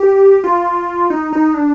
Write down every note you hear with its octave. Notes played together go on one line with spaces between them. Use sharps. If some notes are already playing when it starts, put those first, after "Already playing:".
Already playing: G4
F4
D#4
D#4
D4